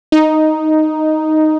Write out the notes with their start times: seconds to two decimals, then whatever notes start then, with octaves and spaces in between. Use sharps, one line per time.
0.12 D#4